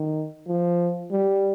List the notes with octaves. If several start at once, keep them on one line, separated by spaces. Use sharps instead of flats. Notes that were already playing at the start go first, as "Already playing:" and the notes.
Already playing: D#3
F3
G3